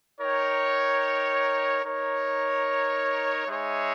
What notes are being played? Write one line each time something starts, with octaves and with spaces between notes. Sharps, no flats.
D#4 A#4 C#5 G5
D#4 A#4 C#5
G#3 D#4 G#4 C#5 E5